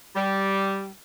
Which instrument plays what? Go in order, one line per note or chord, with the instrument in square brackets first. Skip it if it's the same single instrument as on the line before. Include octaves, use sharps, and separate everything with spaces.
[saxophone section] G3